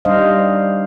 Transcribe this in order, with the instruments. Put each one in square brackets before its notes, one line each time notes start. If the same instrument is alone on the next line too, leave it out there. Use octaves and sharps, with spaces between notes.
[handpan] G3 D4 D#4 C5 D#5 F5